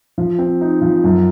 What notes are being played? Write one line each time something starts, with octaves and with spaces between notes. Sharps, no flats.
F3
C4
D#4
F3
F#2